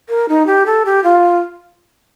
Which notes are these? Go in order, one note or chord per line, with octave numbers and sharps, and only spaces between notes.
A#4
D#4
G4
A4
G4
F4